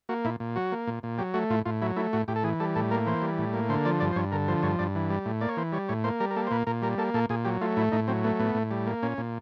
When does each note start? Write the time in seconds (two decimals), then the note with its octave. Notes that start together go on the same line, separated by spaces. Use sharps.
0.09 A#3 F#4
0.25 A#2 E4
0.40 A#2
0.56 F#3 F#4
0.72 A#3
0.87 A#2
1.03 A#2
1.18 F#3 G4
1.34 A3 F#4
1.50 A2 F4
1.65 A2 F4
1.82 F#3 E4
1.96 A3 E4
2.13 A2 F#4
2.28 A2 G4
2.36 A4
2.43 E3 G#4
2.60 G3 A4
2.75 A2 A4
2.91 A#3 A#4
3.06 E3 C5
3.22 G3
3.38 A2
3.53 A#3
3.69 D3 C5
3.85 F3 D5
4.00 G2 D5
4.12 C5
4.16 G2 C#5
4.32 D3 A#4
4.48 F3 C5
4.63 G2 C#5
4.79 G2 D5
4.95 E3
5.10 G3
5.25 A2
5.41 A#3 D5
5.49 C#5
5.57 E3 C5
5.72 G3 C#5
5.89 A2 C#5
6.04 A#3 C5
6.20 G3 A#4
6.31 A#4
6.36 A#3 A4
6.47 C5
6.51 A#2 B4
6.67 A#2 A#4
6.82 G3 A#4
6.98 A#3 A4
7.14 A#2 A4
7.29 A#2 G#4
7.45 F#3 G4
7.61 A3 F4
7.77 A2 E4
7.92 A2 D#4
8.08 F#3 C4
8.24 A3 B3
8.40 A2 B3
8.55 A2
8.71 G3
8.87 A#3
9.03 A#2 C#4
9.18 A#2